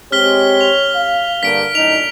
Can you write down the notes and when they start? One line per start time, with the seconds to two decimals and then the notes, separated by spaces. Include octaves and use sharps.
0.12 G#3 C4 G4 C#5 F6 B6 G7
0.61 F7
0.95 F5
1.43 G2 D3 A#3 B6 D7
1.75 F#2 A2 D4 D#4 F7